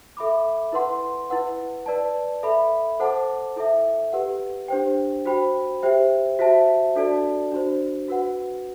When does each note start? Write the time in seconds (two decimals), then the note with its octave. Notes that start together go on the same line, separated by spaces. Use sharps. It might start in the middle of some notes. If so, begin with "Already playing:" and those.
0.17 A4 E5 B5 D6
0.72 E4 B4 F#5 C6
1.30 E4 B4 F#5
1.86 B4 D5 A5
2.43 A4 E5 B5
3.00 A4 C5 F#5 A5 D6
3.56 E4 A4 E5
4.13 G4 B4 F#5
4.68 D4 G4 C5 G5
5.25 F#4 C5 G5 B5
5.83 G4 C5 E5 G5
6.39 F#4 C5 E5 A5
6.95 D4 F#4 A4 D5 A5
7.52 D4 F#4 C5
8.08 F#4 B4 F#5